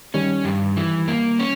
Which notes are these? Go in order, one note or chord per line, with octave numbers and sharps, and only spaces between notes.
D#3 G3 C#4
G2
E3
A#3
C#4